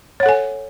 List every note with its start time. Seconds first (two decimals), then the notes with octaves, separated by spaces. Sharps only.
0.20 C#5
0.23 F#5
0.26 A4
0.29 G#5